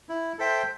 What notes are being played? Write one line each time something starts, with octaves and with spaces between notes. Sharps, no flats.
E4
A4 C5 E5 G5